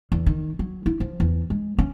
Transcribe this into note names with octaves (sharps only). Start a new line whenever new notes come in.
E2
D#3
F#3
E4
F3
E2
G#3
C#4